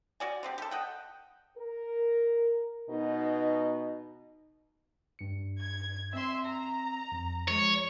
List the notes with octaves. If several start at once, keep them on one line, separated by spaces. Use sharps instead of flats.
F#4 D5 G#5
D3 C4 G4
G4 A4
D#5 F#5 G5
A#4
B2 D#4
G2 C#7
G#6
C4 E5 C6
A#5
F2
F3 G#3 C#5